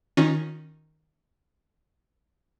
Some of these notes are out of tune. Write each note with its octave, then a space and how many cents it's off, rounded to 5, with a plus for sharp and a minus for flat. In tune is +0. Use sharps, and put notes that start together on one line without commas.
D#3 +0 C#4 +0 F4 +35